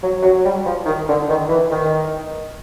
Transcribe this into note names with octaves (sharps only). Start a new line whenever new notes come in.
F#3
F#3
G3
F3
D#3
D3
D#3
E3
D#3